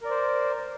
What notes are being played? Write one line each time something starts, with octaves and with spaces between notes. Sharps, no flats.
A#4 C5 D5